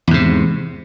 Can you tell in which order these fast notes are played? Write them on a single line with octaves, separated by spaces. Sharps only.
E2 G#2 C3